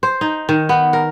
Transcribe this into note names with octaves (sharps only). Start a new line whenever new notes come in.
C5
D#4
D#3
B3
A#4